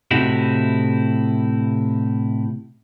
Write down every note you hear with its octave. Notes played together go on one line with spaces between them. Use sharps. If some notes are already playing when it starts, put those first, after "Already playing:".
A2 C3 D#4 E4 F#4